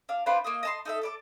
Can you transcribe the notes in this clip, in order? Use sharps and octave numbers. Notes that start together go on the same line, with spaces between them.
D4 F5
D4 F4 B4 C5
A#3 F4 D#5
D#5 A5 C6
D#4 A4 E5
A4 D5 D6